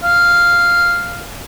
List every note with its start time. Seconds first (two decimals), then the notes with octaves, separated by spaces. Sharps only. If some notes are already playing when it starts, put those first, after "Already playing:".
0.04 F5